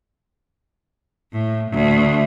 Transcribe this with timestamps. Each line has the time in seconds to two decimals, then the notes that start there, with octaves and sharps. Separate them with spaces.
1.32 A2
1.72 D2